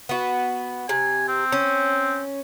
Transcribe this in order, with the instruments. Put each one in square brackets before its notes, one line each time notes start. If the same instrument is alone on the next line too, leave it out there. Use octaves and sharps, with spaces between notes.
[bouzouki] B3 F#4
[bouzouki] C3 [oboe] G#5
[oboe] C4
[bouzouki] C#4